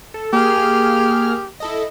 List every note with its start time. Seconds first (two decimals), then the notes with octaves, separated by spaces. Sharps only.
0.14 A4
0.33 A#3 G4 G#4 F6
1.60 E4 A4 D#5